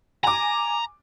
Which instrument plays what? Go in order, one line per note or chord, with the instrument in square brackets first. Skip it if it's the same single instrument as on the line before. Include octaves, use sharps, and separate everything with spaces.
[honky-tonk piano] G#5 D6 [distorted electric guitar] A#5